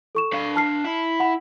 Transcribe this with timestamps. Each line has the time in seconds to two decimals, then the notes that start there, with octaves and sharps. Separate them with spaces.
0.15 A4 C#6 E7
0.33 D4 F5
0.56 A5 F6 C7
0.84 E4
1.20 F#5 B5